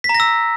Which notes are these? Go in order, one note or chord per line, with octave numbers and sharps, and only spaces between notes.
B6
A#5
A#6
E6